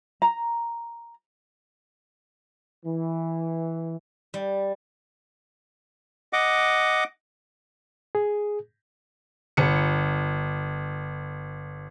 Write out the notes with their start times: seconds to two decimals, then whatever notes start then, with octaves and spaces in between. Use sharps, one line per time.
0.22 A#5
2.84 E3
4.34 G3
6.33 D#5 F#5 D6
8.15 G#4
9.57 G1 C#7